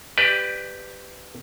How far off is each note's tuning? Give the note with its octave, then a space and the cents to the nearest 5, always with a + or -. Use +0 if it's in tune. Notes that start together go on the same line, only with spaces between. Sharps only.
G4 +0 B4 +20 D5 +20